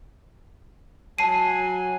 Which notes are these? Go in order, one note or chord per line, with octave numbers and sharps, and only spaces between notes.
F#3 G#5 A5 C7 D#7